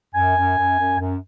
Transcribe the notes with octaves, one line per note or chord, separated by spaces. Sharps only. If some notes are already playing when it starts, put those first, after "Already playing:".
F#2 G#5
F#2
F#2
F#2
F#2